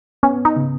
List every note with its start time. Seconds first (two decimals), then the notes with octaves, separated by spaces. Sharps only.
0.23 B3 C#4
0.45 D#4
0.57 C#3